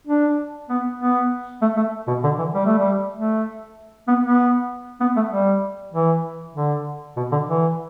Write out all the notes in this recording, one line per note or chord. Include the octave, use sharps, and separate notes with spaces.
D4
B3
B3
A3
A3
B2
D3
E3
G3
A3
G3
A3
B3
B3
B3
A3
G3
E3
D3
B2
D3
E3